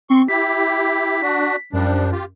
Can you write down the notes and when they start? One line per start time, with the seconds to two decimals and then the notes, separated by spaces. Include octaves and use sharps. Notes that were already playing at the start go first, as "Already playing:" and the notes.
0.10 C4 C6 C#6
0.28 E4 G4 B6
1.22 D4 F#4
1.73 F#2 F3 G3 D4
2.12 F4 G4